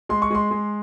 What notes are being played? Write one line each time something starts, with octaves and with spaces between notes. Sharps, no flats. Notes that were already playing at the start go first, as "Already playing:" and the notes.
G#3 C6
C#6
G#3 C6
G#3